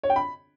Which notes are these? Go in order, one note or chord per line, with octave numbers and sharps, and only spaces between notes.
C#5
G5
B5